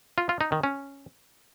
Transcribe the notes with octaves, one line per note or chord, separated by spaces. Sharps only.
F4
F4
D#4
D#3
C#4